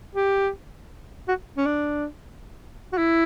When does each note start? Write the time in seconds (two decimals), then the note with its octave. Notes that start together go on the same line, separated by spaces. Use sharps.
0.15 G4
1.28 F#4
1.57 C#4
1.66 D4
2.93 F#4
2.98 E4